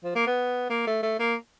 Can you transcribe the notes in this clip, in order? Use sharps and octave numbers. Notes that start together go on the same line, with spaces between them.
F3
A#3
B3
A#3
A3
A3
A#3